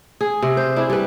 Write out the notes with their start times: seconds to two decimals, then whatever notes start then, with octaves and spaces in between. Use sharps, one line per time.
0.21 G#4
0.42 C3
0.57 C5
0.76 D4 E4 G#4
0.90 G3 B4